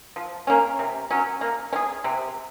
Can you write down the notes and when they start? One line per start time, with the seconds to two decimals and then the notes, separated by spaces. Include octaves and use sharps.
0.16 F3
0.47 A#3 C#4
0.79 C3
1.10 F#3 C#4
1.41 A#3
1.73 C#4
1.76 G#4
2.04 C3